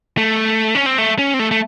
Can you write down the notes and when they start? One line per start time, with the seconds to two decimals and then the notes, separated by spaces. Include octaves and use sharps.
0.18 A3
0.75 C#4
0.86 C4
0.98 A3
1.19 C#4
1.34 C4
1.39 A3
1.51 A3